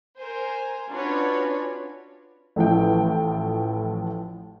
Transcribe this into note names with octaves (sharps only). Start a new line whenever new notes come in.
A#4 C5 G#5
C#4 D4 F4 F#4 B4 C#5
A1 A2 E3 F3 E4 G5